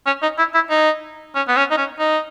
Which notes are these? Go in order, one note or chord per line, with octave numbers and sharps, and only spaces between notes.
C#4
D#4
E4
E4
D#4
C#4
B3
C#4
D#4
C#4
D#4